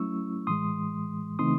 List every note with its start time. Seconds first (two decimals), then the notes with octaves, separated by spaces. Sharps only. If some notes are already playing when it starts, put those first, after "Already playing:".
Already playing: F#3 A3 C#4 E4 C#6 E6
0.47 A2 E3 G#3 C6 D#6
1.39 C#3 E3 A3 C4 D#4 C6 D#6